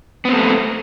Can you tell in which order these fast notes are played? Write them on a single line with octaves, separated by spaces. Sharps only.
B3 C4 A3